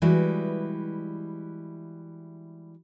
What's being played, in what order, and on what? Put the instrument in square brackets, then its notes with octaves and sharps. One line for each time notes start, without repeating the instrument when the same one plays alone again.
[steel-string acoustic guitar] E3 G3 G#3 E4 F#4 B4